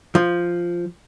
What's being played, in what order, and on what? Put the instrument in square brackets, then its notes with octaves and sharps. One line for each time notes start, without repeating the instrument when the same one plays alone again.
[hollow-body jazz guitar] F3